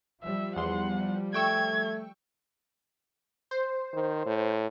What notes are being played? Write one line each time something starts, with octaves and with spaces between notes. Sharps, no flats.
F3 G3 E5
E2 F#5 C6
A3 G5 C#6 E6 G#6
C5
D#3
A2